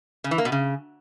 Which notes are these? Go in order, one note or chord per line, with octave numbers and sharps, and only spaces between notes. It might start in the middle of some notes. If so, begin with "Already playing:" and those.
C#3
E3
A#3
B2
C#3